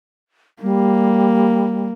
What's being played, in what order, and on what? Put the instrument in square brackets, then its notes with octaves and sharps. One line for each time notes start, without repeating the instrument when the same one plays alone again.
[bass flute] G3 [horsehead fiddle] A#3